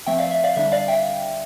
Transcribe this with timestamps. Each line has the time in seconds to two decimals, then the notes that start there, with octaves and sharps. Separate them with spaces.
0.06 F3 A3 C4 E5 G5
0.19 D5 F5
0.31 E5
0.44 D5 F5
0.56 D3 G3 D4 E5
0.72 D5 F5
0.88 E5 G5